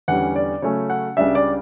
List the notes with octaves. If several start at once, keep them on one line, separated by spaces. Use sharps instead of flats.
E2 D3 G3 C#4 F#5
D5
C#3 F#3 A3 C#4 C#5
F#5
C#2 C#3 G3 D4 E5
D5